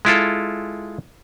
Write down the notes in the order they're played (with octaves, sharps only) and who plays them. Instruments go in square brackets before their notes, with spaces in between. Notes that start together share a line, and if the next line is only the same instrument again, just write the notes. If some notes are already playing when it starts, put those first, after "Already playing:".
[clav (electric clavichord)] G#3 E4 F4 A4